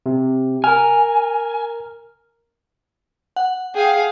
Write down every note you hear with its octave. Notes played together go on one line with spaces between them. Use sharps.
C3
A#4 G#5 F6
F#5
G#4 F5 G5